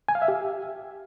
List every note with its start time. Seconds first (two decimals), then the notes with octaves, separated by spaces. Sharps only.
0.09 G#5
0.15 F5
0.22 E5
0.28 G4